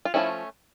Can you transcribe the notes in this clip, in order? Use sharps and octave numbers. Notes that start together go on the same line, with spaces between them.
F4
F3 A3 C#4 E4